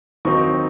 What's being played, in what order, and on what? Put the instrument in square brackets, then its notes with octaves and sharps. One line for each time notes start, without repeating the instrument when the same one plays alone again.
[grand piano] D#2 D#3 F#3 C4 D#4 C#6